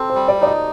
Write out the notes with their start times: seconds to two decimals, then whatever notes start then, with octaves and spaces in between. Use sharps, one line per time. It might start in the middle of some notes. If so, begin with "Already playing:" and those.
Already playing: C4 A4
0.10 C5
0.15 G3
0.28 D5
0.41 D#4 D5
0.47 D#5